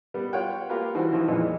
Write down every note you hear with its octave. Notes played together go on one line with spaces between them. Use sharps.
G3 B3
F4 C#5 F#5 G5
A#3 F4 G4 A#4 B4
D#3 E3 G3 F#4 C5
E3 F3 D#4 E4
F2 A#2 E3 G#3 D#4